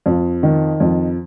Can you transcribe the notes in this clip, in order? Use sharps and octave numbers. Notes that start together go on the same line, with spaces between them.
F2
D#3
F2